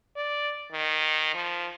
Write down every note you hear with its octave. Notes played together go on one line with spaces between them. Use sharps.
D5
D#3
F3